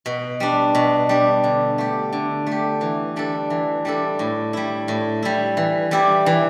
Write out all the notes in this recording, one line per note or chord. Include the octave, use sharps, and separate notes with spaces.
B2
G3 D4
B2
G3 D4
D3
A3 G4
D3
A3 G4
E3
G3 D4 A4
E3
G3 D4 A4
A2
G3 E4
A2
G3 E4
E3
G3 E4 G4
E3